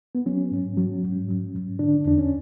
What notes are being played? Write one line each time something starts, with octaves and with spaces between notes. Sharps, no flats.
B3
F#3 C#4
G#2
F#3
G#2
F#3
G#2
D3 D4
E2 D4
C#4